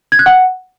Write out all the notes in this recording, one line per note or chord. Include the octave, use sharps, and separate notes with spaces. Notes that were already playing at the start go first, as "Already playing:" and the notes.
G#6
F#6
F#5